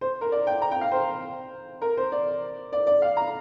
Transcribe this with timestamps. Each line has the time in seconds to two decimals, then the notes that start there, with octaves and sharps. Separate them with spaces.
0.01 C5
0.21 A#4
0.32 D5
0.47 G5
0.62 A#5
0.71 G5
0.81 F5
0.92 C5
1.82 A#4
1.97 C5
2.12 D5
2.73 D5
2.87 D5
3.02 F5
3.17 A#5